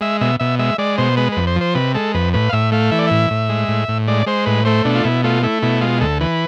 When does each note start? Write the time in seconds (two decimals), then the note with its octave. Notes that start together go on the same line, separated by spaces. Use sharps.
0.01 G#3 E5
0.21 B2 E5
0.40 B2 E5
0.59 G#3 E5
0.78 G#3 D5
0.98 B2 C5
1.17 G#3 B4
1.32 F2 B4
1.47 C5
1.56 F3
1.61 C5
1.75 C3 B4
1.94 G#3 A4
2.14 F2 B4
2.34 A2 B4
2.49 F5
2.53 A2 E5
2.72 A3 F5
2.91 E3 E5
2.99 D5
3.07 A2 E5
3.30 A2
3.49 G#3
3.68 A2
3.88 A2
4.08 G#3 D5
4.26 G#3 C5
4.46 A2 B4
4.65 A3 C5
4.85 B2 D4
4.95 F4
5.04 B2 E4
5.24 A3 F4
5.43 A3 E4
5.62 B2 E4
5.81 G#3 F4
6.01 D2 A4
6.20 E3 B4